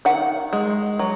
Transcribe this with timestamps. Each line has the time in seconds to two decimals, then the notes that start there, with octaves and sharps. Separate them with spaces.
0.05 D#3 F#5
0.53 G#3
0.99 F#3